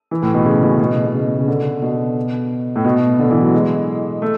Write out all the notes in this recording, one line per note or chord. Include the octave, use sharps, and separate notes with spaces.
E3
A2
B2
C#3
B2
C#3
B2
B2
C#3
C#3
D3
B2
A2
B2
D3
E3
F#3
G#3
A3